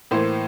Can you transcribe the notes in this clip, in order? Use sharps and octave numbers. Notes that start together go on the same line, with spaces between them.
A2 E3 A#3 C5